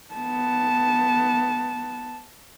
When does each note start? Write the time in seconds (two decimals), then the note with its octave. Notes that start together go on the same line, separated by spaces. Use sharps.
0.15 B3 A5